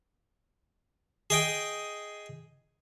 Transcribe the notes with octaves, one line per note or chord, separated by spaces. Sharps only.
G#4 D#5 G5